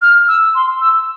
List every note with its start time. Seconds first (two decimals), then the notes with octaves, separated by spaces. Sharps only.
0.02 F6
0.28 E6
0.55 C6
0.81 E6